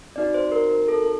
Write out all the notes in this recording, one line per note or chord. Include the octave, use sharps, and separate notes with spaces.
C4 D#4 F#4 D5
C5
A#4
A#4
A4
A4